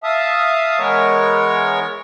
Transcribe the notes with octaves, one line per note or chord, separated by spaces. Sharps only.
E5 F5 A5 D#6
E3 G#3 B3 A#4 C#5 C#6